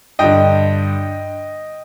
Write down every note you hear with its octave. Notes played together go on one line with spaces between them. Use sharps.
G2 D3 D#5 G5